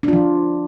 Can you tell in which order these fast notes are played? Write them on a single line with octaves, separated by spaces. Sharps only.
D4 F4 F3